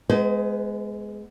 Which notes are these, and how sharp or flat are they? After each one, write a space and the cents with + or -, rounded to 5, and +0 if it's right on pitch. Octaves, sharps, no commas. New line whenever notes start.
G#3 +10 B3 +15 C5 -35